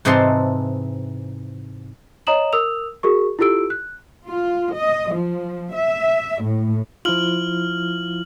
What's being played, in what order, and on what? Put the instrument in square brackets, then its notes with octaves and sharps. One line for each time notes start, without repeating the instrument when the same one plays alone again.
[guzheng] G#2 C3 E3 D#5 A5 C6
[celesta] C#5 D#5 A#5 D#6 E7 F#7
A#4 D#6 E6 F7
F#4 G#4 A#4 C#6
E4 F4 G4 A4 E6 D7
F#6
[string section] F4
D#5
F3
E5
A2
[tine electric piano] F3 E4 F4 [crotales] F6 F#7